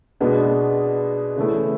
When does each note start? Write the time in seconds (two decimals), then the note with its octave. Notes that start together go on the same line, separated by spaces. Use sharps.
0.20 B2 G#3 B3 D4
1.36 C#3 E3 A3 E4